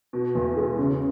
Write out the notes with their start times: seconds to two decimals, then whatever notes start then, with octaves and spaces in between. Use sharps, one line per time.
0.13 B2
0.35 E2
0.57 G#3
0.78 C#3